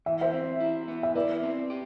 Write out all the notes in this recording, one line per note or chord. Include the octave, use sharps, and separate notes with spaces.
E3 E5
C5 E5
C4
E4
B3
E5
E4 B4 D5
C4
G4